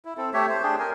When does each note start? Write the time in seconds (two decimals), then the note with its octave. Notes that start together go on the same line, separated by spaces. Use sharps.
0.05 E4
0.17 C4 A4
0.34 A3 G4 C#5 E5
0.49 C5
0.63 D4 G4 G#4
0.79 A#4 G#5